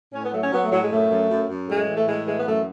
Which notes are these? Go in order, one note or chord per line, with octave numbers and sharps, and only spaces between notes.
A2 C#4
B3
F#3 A3
C#4
F#3 B3
A3
A2 F#3
G#3
F#2 A3
F#2
F#2
F#2
A2 G#3
E3
A3
A2 G#3
E3 G#3
B3
F#2 A3